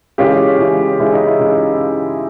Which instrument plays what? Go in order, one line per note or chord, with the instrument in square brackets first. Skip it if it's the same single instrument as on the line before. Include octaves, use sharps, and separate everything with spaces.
[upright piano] C#3 E3 G#3 C#4 F4 G4
C#3 E3 G#3 C#4
C#3 E3 G#3 C#4 E4
D#4
E4
C#3 E3 G#3 C#4